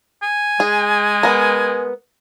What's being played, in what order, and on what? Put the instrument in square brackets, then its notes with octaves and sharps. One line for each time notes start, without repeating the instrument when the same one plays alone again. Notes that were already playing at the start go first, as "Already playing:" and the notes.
[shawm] G#5
[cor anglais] G#3 [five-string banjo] G#4
[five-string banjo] B3 A#4